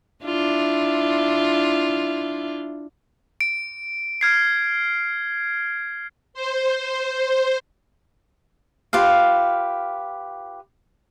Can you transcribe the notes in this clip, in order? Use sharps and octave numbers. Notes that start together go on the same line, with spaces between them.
D4 E4 F4
D7
F6 G#6 C7
C5
F4 G4 B4 F5